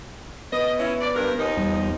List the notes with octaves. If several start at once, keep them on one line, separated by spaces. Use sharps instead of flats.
B3 B4 D#5
C#4 E4
D5
G2 A#4
D#2 F3 D#4
E2 G3 B3